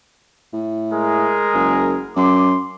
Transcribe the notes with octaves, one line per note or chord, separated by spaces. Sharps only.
A2
G#3 G#4 A#4
F#1
F#2 C6 D6